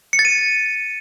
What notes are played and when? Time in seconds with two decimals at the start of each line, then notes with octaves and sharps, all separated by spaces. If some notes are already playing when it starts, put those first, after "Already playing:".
0.13 C#7
0.19 A6
0.25 D#7